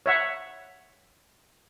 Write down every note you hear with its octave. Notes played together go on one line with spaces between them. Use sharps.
C#5 E5 F#5